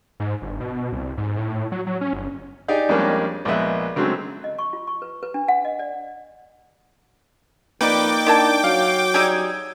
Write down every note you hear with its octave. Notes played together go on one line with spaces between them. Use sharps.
G#2
G1
B2
C2
G#2
A2
F#3
F#3
C#4
G1
D#4 G4 G#4 D5 D#5
F2 G3 G#3 A#3 C#4 D4
A#1 G#3 B3 D#5 E5 F#6
C#3 F#3 G#3 A3 C4
D#5
C#6
F4
C#6
B4
B4
D4
F#5
D#5
D5
F2 A#3 D#4 B4 D5 G5 D6
D#3 D4 E4 A5
F#3 F5
G3 D#4 G#4 E6 G6 G#6